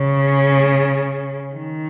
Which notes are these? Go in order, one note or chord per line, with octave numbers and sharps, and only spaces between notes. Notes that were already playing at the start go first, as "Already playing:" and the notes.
Already playing: C#3
D#3